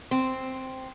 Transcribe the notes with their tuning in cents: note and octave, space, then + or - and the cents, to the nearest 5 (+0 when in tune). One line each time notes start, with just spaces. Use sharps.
C4 +0